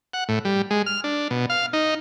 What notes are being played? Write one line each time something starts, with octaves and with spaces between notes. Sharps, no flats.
F#5
A2
G3
G#3
F6
D4
B2
F5
D#4